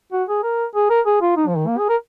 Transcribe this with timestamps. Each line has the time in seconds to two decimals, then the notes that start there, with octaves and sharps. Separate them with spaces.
0.12 F#4
0.29 G#4
0.43 A#4
0.75 G#4
0.90 A#4
1.06 G#4
1.22 F4
1.37 D#4
1.48 F3
1.57 D#3
1.67 A#3
1.78 G#4
1.89 A#4